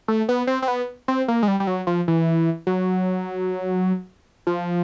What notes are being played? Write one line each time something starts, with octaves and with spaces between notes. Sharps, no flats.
A3
B3
C4
C4
B3
C4
A#3
G#3
G3
G3
F#3
F3
E3
F#3
F3